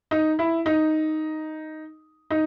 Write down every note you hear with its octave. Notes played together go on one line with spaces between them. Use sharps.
D#4
E4
D#4
D#4